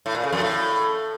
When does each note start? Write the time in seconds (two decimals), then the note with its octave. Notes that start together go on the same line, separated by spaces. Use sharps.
0.06 A2
0.15 A#2
0.24 C#3
0.32 F2
0.41 A2